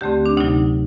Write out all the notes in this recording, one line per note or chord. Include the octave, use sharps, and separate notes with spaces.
D2 D3 A3 C4 G4
D4
D2 C3 F#3 D#4